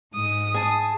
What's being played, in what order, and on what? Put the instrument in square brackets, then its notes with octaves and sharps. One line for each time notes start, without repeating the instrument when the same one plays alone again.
[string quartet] G#2 [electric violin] D#6
[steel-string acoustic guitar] G#4 A5